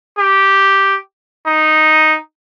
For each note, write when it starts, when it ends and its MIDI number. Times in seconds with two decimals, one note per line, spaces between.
0.18 0.95 67
1.46 2.16 63